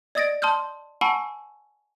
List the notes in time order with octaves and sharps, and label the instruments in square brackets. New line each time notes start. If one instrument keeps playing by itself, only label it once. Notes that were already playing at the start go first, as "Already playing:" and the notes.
[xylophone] D5 D#5 D#6 A6 A#6 D7
A5 C6 D#6 F6 G6
F#5 G#5 A5 B5 C#6 E6